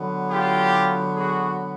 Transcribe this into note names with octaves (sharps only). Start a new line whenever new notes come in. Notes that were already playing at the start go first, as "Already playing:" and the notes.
Already playing: D3 F#3 B3
F4 G4
F#4 G#4